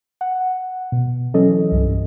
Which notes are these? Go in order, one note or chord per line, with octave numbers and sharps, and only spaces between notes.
F#5
B2
E3 F#3 C#4 A4 D#5
C2 G2